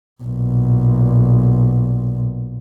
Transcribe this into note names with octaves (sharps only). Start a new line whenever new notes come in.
B1 A#2